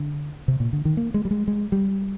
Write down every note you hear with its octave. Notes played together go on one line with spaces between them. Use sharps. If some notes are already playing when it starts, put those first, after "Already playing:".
Already playing: D3
C3
A#2
D3
D#3
A#3
G#3
G3
G#3
G#3
G3